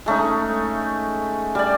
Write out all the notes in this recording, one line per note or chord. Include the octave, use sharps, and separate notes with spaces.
G#3 A3 C#4 D#4
G3 D5